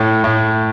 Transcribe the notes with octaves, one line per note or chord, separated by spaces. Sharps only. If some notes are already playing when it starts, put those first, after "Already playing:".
Already playing: A2
A2